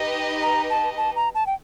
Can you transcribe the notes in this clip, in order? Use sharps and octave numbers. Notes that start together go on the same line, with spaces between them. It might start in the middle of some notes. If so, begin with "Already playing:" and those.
Already playing: D#4 G4 B4 D#5
A#5
A5
A5
A#5
A5
G5